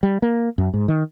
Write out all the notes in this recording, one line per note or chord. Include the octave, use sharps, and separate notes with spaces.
G3
A#3
F#2
G#2
D#3